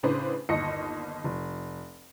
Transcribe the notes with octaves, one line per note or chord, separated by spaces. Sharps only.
A2 C#3 D4 B4 C5
G1 D#2 D#5 A#6 C#7
F1